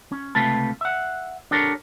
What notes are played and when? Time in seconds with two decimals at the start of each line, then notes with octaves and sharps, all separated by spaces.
0.12 C#4
0.35 C#2 C3 A3 F4 B4 A5
0.81 E5 F#5
1.51 D4 G4 A4 A#4 C#5